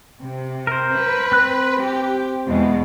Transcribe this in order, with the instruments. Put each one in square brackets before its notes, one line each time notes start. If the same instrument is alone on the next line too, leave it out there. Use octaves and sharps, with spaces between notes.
[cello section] C3
[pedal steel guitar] A#4 C5
[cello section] B4
[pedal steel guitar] C4 F#6
[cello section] G4
E2 B2 G#3